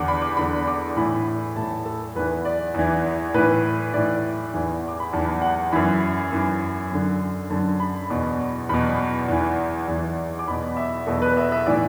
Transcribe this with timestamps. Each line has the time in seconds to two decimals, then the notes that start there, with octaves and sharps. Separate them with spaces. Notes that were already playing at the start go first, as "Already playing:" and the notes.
Already playing: E2 D3 F#5 D6
0.08 B5
0.22 D6
0.37 E2 D3 B5
0.67 D6
0.97 A2 E3 B5
1.56 A2 E3 A5
1.86 A4
2.15 E2 E3 B4
2.45 D5
2.74 E2 E3
3.34 A2 E3 B4
3.93 A2 E3 D5
4.54 E2 E3
4.88 D6
5.00 B5
5.13 E2 E3 A5
5.42 F#5
5.72 F#2 E3 B5
6.32 F#2 E3
6.92 F#2 D3
7.50 F#2 D3 A5
7.80 B5
8.10 E2 B2
8.69 E2 B2 B5
9.28 E2 E3
9.88 E2 E3
10.39 D6
10.48 E2 B2 B5
10.77 E5
11.07 E2 B2 A4
11.22 B4
11.37 E5
11.52 E5
11.66 A2 E3 D5